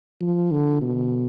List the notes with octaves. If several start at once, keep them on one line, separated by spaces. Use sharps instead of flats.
F3
D3
B2